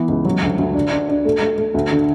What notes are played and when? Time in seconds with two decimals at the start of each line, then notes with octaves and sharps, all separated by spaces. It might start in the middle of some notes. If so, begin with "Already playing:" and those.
Already playing: E3 B3
0.08 C#2
0.25 F#3
0.42 D2
0.59 D2
0.75 D4
0.91 D4
1.09 D4
1.25 A3
1.41 A3
1.58 A3
1.74 D2
1.91 D3